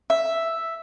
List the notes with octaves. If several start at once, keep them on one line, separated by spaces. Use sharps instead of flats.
E5